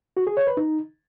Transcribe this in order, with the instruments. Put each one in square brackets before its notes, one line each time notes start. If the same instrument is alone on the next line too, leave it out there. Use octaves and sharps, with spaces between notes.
[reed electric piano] F#4
G#4
C#5
B4
D#4